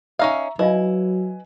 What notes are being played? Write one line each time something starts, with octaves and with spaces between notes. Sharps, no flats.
C#4 D#4 E5 F5 A#5 C#6
F#3 D#4 E4 B4 D#5 F5 G#5